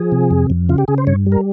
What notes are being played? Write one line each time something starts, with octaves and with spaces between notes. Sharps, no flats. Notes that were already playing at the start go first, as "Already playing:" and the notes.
Already playing: F3 G#4
C3
F2
F2
C#3 F4
G4
C#3 G#4
C5
G2 C#5
G3
A#4